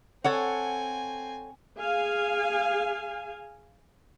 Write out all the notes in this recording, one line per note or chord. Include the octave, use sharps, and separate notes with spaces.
C4 A4 C#5 F#5 G#5
G#4 F5 G#5